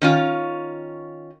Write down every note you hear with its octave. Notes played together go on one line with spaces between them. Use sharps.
D#3 C#4 F4